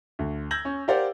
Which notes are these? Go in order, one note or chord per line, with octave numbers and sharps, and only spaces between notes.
D2
E6 G6 G#6 A#6 F#7
C#4
G4 A#4 C5 D5 F5 F#5